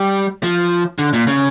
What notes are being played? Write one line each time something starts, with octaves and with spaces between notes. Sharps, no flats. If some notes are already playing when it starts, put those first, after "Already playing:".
Already playing: G3
F3
D3
A#2
C#3